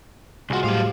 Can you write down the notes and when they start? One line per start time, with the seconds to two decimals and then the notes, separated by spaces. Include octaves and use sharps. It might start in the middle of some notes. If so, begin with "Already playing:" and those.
0.50 C2 G#3 F4 F#4
0.64 A2 F#3 G3 A3 C4 G4 F5